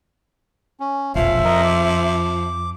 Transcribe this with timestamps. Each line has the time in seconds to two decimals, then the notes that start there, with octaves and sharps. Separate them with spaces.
0.80 C#4
1.15 E1 A#1 F2 F3 E5 F5
1.45 F2 A#4 D#5
1.64 D6